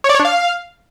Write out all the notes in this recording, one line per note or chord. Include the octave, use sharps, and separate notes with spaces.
C#5
D5
C#5
D4
F5